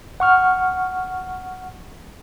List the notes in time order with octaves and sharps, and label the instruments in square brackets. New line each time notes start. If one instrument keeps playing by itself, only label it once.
[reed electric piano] F#5 C#6 F6